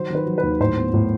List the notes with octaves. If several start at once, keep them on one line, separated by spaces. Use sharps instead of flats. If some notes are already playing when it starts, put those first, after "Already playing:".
Already playing: D#3 F#3 C5
D#3 B4
F#3
B4
D#2
A2 C5
B3
A2